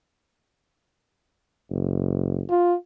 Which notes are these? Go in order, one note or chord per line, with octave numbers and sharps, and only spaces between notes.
F#1
F4